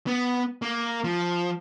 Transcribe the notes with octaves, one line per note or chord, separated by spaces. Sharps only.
B3
A#3
F3